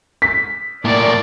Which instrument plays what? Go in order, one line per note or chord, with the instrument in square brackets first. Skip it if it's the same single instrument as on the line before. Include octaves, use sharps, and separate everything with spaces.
[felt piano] B6
[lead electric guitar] A2 A#3 [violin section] D5